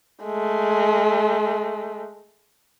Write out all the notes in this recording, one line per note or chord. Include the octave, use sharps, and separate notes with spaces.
G#3 A3